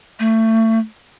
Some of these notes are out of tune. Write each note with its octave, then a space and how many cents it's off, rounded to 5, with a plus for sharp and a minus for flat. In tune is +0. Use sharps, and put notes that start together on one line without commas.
A3 +25